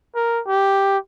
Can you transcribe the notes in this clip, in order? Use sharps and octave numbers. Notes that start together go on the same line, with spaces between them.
A#4
G4